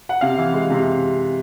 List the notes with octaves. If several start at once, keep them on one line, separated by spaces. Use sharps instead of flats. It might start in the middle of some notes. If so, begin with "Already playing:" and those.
F#5
C3 F5
E3
G#3
C3